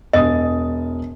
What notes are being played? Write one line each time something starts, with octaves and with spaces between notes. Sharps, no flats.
E1 D#5 D#6